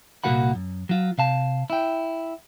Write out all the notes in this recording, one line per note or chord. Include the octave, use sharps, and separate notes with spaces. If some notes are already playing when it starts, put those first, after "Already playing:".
C2 A#2 A#3 F#4 F#5 B5
F#2
F#3 F4
C3 F5 A5
E4 G5